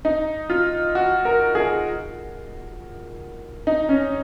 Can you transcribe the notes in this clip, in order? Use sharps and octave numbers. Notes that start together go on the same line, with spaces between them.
D#4
F4
F#4
A#4
G#4
D#4
C#4